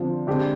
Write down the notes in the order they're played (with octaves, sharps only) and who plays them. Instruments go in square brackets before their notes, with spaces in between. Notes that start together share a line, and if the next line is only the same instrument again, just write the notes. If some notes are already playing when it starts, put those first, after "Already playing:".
Already playing: [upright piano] D3 F3 C4
D3 G#3 C4 G4